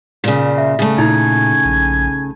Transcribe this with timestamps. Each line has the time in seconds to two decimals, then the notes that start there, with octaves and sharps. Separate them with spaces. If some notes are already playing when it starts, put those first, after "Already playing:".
0.24 A#2 C#3
0.58 E5
0.79 C#3 A3
0.98 A#2 D#4 E4 G#5
1.65 A#1